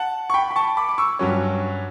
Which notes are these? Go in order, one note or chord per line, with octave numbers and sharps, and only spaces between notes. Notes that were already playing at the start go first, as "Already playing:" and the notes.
Already playing: F#5 A5
C#6
G5 B5
B5
A5 C#6
B5 D6
D6
C#6 E6
G2 F#3 C#4